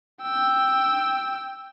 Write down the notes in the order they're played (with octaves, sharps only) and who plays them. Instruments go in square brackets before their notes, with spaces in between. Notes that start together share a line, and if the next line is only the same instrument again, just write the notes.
[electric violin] G5 E6